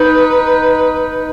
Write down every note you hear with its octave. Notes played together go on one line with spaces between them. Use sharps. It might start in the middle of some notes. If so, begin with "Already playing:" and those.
Already playing: D#4 B4